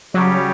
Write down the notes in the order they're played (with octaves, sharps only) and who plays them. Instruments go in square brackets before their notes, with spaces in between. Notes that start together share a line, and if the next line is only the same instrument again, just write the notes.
[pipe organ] C#3 G3 C#4 G4 [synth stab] F#3